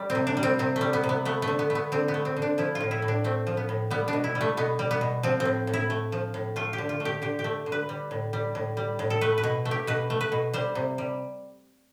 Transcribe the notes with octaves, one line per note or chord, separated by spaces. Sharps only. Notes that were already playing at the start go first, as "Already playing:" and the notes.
Already playing: G3
C4
C3
D4
G3
C4
C3 C4
A3
G3
B3
C3
B3
A3 B3
A3
D3
B3
A3
B3
D3 C4
B3
A3
C4
D3
D4
F3 E4
F4
A2
E4
A2
D4
A3 C4
F3
B3
A2
G3 B3
D4
B2
E4
G3
A3
B2 B3
G3
B3
B2
F3 C4
C4
A2
A2
E4
A3
F3
A2
A3 F4
G4
D3
F4
A3
G4
D3 G4
G4
A3
D3
B4
G3
A2
G3
A2
G3
A2
A4
A3 B4
B4
B2
A3
G4
B2 B4
A3
B4
B2
G3 C5
C3
G3